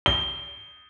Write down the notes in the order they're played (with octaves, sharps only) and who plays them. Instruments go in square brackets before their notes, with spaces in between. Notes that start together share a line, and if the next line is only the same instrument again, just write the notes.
[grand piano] G7